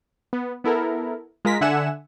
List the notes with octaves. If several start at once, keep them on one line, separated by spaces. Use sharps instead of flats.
B3
B3 E4 A4 A#4
G#3 F4 A#4 A#6 B6
D3 E5 F#5 G#5 E7